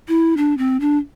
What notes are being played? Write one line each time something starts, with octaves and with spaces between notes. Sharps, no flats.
E4
D4
C4
D4